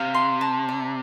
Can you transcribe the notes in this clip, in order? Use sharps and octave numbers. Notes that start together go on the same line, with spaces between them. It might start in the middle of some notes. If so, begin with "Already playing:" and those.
Already playing: C3 F5
C6
A5
D5